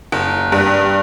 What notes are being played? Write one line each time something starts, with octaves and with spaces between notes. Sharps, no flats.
F#1
G2